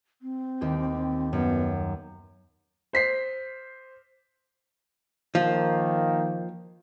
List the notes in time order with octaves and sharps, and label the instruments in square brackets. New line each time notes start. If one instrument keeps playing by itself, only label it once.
[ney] C4
[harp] D#2 G4
[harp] F#2 [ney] B3
[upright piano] C5 B6 C7
[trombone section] D#3 A#3 [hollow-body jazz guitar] F3